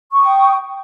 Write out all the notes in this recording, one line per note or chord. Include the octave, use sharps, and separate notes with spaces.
G5 C#6 D#6